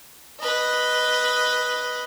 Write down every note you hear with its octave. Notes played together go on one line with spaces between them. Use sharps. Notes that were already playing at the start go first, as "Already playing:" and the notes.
B4 D#5